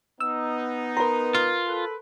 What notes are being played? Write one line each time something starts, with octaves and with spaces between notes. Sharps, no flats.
B3 D#4 E6
A#4 B4 A#5 C6
F4
A4 B4